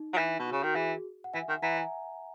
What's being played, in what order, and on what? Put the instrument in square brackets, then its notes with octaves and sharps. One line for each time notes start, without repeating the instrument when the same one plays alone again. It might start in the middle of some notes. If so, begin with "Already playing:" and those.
Already playing: [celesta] D#4
[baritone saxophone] F#3
E3
B2
[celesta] F#4
[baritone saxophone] C#3
[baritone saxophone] D#3 [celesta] F#4
[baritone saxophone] E3 [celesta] G#4
[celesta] F#5
[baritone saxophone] E3 [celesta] E5 G#5
[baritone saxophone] D#3
[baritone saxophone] E3 [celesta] F#5 A#5
[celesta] E5 G#5